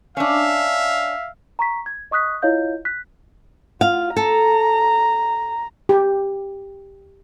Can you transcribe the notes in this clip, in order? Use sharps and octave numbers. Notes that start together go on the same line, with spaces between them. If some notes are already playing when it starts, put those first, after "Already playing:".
C#4 D4 E5 F5
A#5 C#6 B6
G#6
D#5 C#6 D#6 F#6 B6
E4 F4 C#5 D#5 F5 G6
F#6 B6
F4 F5
A4 A#5
G4